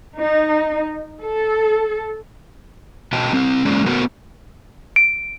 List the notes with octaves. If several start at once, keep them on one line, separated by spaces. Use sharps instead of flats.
D#4
A4
B2 F#4 D#5 G5 A5
G3 C4
G#3 A#3 C#4 D5
A3 B3 F#4 A#4 C5 F#5
D7